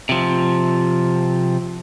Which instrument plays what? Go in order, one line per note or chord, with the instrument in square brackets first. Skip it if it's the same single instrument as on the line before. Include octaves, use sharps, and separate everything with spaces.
[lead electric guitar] C3 F3